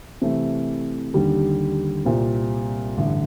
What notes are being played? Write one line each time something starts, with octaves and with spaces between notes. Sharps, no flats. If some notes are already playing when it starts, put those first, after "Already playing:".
C3 E3 A3
D#2 D3 G3
C2 A#2 G3 C4
A1 G2 D3